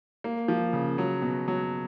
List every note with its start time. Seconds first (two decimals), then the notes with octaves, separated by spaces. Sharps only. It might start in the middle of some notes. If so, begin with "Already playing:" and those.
0.24 A#3
0.48 F3
0.73 C#3
0.98 F#3
1.22 B2
1.48 F#3